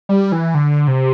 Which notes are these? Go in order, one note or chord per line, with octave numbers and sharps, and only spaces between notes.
G3
E3
D3
C3